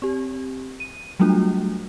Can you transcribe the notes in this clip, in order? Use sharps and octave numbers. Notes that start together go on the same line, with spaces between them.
C4 G4
D#7
F#3 G3 A3 D4 F4 F#4